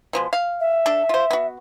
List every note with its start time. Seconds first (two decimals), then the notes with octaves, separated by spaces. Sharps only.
0.13 B2 F3 G#3
0.33 F5
0.60 E5
0.86 D4 A4
1.09 F4 C5
1.31 B3 F#4